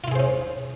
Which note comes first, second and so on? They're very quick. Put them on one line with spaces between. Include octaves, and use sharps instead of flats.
F4 E4 G#4 C5 C#4